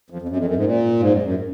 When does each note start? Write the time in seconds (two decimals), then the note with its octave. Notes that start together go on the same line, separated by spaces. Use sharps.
0.10 F2
0.22 F2
0.28 F#2
0.36 F2
0.45 F#2
0.55 G#2
0.64 A#2
1.00 G#2
1.12 F#2
1.22 F#2